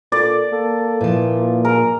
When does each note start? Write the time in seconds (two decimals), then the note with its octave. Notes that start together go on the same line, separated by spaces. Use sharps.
0.12 A#2 A4 D5
0.53 A#3 A4
1.01 A#2 E3 F3
1.65 G#4 A#4